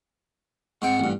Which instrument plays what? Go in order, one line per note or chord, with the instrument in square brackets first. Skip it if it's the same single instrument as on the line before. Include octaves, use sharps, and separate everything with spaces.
[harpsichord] G#2 C4 G5 [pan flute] F#5
[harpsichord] A1 G2